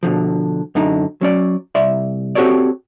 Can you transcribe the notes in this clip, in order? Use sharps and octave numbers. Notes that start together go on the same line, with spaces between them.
B2 D3 F3
F#2 D3 D#4
F#3 C#4 D5
C2 D5 E5 C6
C4 F#4 G4 A4 C#5 D5